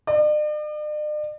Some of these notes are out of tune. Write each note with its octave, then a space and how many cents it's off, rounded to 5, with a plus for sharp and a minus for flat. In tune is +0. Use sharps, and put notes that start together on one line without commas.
D5 +45